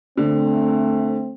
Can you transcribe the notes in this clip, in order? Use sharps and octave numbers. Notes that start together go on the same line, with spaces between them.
D3 A3 C4